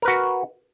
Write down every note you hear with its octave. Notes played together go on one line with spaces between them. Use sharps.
F#4 A#4 B4